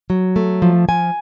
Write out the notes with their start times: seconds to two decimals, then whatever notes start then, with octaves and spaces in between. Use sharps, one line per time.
0.10 F#3
0.36 A3
0.62 F3
0.89 F3 G#5